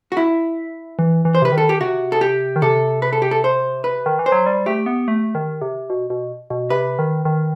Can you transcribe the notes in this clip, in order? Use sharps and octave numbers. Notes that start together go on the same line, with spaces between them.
F#4
E4
E3
E3
C5
C3 B4
D#3
A4
G4
C3 F#4
A4
G4
D#3
C3 A4
B4
A4
G4
A4
C5
B4
D#3
E3
C5
F#3
G3
A3 G4
B3
A3
D#3
C3
B2
B2
B2
C3 B4
D#3
D#3